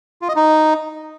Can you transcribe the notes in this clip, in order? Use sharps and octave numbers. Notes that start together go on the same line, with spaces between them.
F4
D#5
D#4